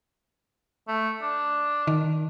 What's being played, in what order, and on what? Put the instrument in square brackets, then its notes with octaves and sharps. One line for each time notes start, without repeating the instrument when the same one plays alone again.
[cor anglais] A3
D4
[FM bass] D#3